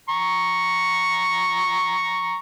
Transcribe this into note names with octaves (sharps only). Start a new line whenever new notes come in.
A#5 C#6